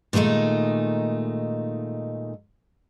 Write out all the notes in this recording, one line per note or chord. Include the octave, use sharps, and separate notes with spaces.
A#2 D#3 G#3 A3 D#4